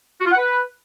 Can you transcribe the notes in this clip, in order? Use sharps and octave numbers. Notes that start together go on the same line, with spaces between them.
F#4
F4
F#5
B4